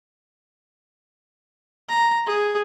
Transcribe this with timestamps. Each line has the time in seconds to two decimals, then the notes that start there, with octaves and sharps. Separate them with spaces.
1.89 A#5
2.26 G#4